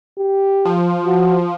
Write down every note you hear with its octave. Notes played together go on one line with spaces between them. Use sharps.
G4
F3
F#4